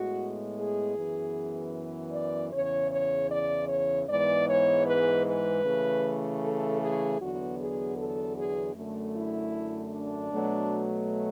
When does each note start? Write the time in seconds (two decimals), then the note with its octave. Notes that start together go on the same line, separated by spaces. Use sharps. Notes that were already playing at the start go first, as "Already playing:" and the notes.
Already playing: A2 G#3 B3 F#4
0.58 G#4
0.96 F#2 E3 B3
2.13 D5
2.52 E2 C#3 E3 C#5
2.92 C#5
3.30 D5
3.69 C#5
4.08 G#2 E3 G#3 B3 D5
4.48 C#5
4.86 B4
5.26 B4
5.64 C#3 E3 A3
6.42 A4
6.81 G#4
7.20 E2 D3 F#3 B3 F#4
7.59 G#4
7.97 A4
8.37 G#4
8.75 F#2 D3 A3
9.14 E4
9.92 D4
10.31 B2 F#3 A3